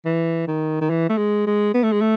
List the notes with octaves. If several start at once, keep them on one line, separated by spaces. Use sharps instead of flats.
E3
D#3
D#3
E3
A3
G#3
G#3
B3
A3
G#3
A3